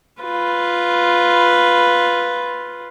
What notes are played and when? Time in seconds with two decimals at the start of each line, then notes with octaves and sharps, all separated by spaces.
0.21 F4 B4